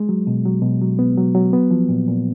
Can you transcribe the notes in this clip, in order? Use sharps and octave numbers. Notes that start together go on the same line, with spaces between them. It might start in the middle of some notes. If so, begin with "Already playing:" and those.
Already playing: G#3
F#3
B2
F#3
B2
F#3
B3
F#3
F#3
B3
F3
A#2
A#2